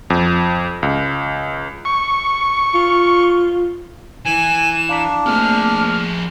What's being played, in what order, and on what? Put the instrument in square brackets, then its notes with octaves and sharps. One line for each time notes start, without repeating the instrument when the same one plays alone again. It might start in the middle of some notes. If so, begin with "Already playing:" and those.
[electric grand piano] F2
C#2
[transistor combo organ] C#6
[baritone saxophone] F4
[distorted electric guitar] E3 [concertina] G#5 [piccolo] E7
[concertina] D4 [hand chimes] F5 A#5 B6
[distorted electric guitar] F3 G#4 [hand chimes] A3 A#3 C4 [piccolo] F6